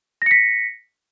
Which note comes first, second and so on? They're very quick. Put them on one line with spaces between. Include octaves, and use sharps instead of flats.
A#6 C#7 B6